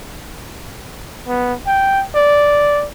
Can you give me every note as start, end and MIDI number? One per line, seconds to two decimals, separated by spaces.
1.28 1.54 59
1.67 2.04 79
2.15 2.87 74